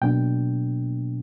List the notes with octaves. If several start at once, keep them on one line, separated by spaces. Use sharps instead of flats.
B2 F#3 A#3 D4 G5